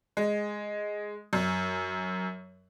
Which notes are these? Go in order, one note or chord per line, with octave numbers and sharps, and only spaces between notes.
G#3
F#2